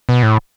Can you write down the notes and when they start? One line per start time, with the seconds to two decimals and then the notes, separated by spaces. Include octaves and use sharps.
0.09 B2
0.23 A2